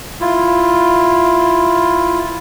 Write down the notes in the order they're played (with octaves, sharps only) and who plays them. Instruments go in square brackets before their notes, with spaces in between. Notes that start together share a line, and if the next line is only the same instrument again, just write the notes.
[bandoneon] E4 F4